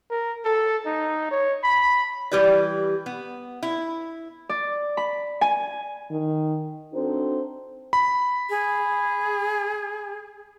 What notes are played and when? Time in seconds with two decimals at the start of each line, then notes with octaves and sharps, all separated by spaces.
0.11 A#4
0.45 A4
0.86 D#4
1.31 C#5
1.63 B5
2.31 E3 G3 G4 B4 D5
3.06 B3
3.63 E4
4.49 D5
4.97 B5
5.41 G#5
6.11 D#3
6.93 C4 D4 D#4 F#4 A4 C5
7.93 B5
8.50 G#4